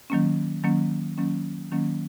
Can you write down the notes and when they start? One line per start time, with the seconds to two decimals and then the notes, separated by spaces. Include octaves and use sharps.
0.10 D#3 F#3 A#3 C#4
0.63 D#3 F#3 A#3 C#4
1.18 D#3 F#3 A#3 C#4
1.72 D#3 F#3 A#3 C#4